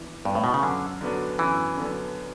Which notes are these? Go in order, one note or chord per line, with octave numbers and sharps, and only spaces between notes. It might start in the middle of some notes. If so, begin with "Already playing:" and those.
Already playing: E3 B3 D4
G2 B3 D4
A2
B2
C#3
F#2 D3
D3 F#3 B3 D4
F#2 E3
D3 F#3 B3 D4